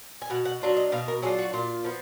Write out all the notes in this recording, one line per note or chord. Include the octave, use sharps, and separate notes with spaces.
G#5
B2 F#5
F#5
F#3 D4 F4
D#5
B2 F5
A#4
F#3 D4 F4 G#4
F#4
A#2 F4
F3 B3